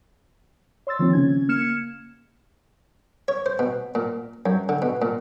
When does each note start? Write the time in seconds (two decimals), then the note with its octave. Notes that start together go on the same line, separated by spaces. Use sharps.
0.87 C#5 C6 E6 A6
0.99 D#3 F3 A#3 C4
1.13 C#3 C#4 G#6
1.49 A#3 F6 G#6 C#7 E7
3.28 C#5
3.46 C5
3.59 B2
3.95 A#2
4.46 F#2
4.69 D3
4.82 B2
5.02 A#2